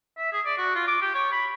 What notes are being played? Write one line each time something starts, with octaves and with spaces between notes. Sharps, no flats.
E5
G#4
D5
F#4
F4
D6
G4
C#5
B5